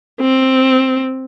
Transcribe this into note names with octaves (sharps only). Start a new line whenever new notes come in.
C4